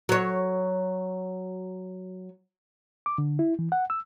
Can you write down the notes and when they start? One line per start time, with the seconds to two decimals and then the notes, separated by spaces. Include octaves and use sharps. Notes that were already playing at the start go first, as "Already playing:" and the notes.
0.09 F#3 C#5
3.06 D6
3.18 D3
3.39 E4
3.59 E3
3.72 F#5
3.90 E6